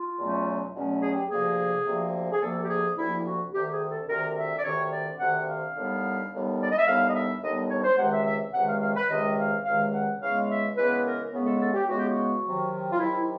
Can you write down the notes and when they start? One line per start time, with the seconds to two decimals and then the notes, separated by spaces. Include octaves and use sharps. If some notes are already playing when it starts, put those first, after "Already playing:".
Already playing: F4
0.19 E2 B2 F#3 A3 C#4
0.75 E2 B2 F#3 A3 C#4
1.02 G#4
1.13 G4
1.24 G#4
1.31 D2 C3 F3 A#3
1.86 D2 C3 F3 A#3
2.32 G#4
2.41 D2 C3 F3 A#3 A4
2.63 G4
2.69 G#4
2.97 D2 C3 F3 A#3 E4
3.25 F#4
3.53 D2 C3 D#3 G4
3.72 G#4
3.90 A4
4.08 D2 C3 D#3 A#4
4.36 E5
4.58 D5
4.64 D2 C3 D#3 C#5
4.92 D5
5.19 D2 C3 D#3 F#5
5.48 F5
5.76 D#2 D3 G3 B3
6.31 D#2 D3 G3 B3
6.63 D5
6.71 D#5
6.79 E5
6.87 D#2 D3 G3 B3 F5
7.09 D#5
7.15 E5
7.42 D#2 D3 G3 B3 D#5
7.70 C#5
7.84 C5
7.98 C#2 C3 D#3 G#3 F#5
8.12 E5
8.26 E5
8.53 C#2 C3 D#3 G#3 F#5
8.67 F5
8.82 F5
8.95 B4
9.09 C#2 C3 D#3 G#3 D#5
9.38 F5
9.65 C#2 C3 D#3 G#3 F5
9.93 F#5
10.20 C#3 E3 G#3 B3 F5
10.49 E5
10.76 C#3 E3 G#3 B3 B4
11.04 A#4
11.32 C#3 E3 G#3 B3
11.46 A4
11.60 A4
11.74 G4
11.88 C#3 E3 G#3 B3 F#4
11.97 G4
12.08 F#4
12.44 C3 D#3 F#3
12.92 F4
12.99 C3 D#3 F#3 E4